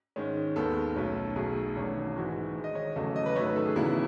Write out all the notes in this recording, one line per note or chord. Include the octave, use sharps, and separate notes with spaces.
G#2 D#3 G#3 C#4
D#2 D#3 G#3 B3 A4
B1 B2 A3 C#4
B1 B2 A3 G#4
E1 E2 D#3 A3 C#4
G#2 E3 G#3 F#4
G#2 D#3 G#3
D#5
C#5
E2 C#3 F#3 A3 C#4 A4
D#5
B4
G#2 D#3 F#3 A3 C#4 C#5
B4
A4
G#4
E1 E2 C#3 F#3 B3 E4